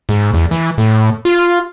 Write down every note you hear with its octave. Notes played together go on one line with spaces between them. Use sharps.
G#2
E2
E3
A2
F4